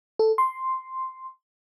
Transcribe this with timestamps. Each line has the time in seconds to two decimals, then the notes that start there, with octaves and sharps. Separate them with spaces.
0.19 A4
0.38 C6